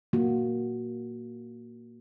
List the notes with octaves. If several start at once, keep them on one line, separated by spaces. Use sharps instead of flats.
A#3 F#4